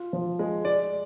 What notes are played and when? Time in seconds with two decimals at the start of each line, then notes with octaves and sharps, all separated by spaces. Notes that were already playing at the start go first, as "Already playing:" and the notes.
Already playing: F4
0.13 F3
0.39 G#3
0.65 D5